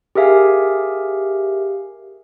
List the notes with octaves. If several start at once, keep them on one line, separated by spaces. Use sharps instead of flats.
G4 G#4 A#4 E5 F5 G#5